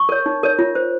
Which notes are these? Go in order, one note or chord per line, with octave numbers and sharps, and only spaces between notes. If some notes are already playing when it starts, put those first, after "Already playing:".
Already playing: C#6
A#4 C#5
D#4
A#4 C#5
F4
C5